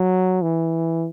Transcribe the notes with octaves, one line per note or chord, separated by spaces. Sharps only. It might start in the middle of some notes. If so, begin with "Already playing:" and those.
Already playing: F#3
E3